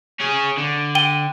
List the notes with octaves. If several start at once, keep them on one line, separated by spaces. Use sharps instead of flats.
C#4 G#4
D3
G5 D#7 G7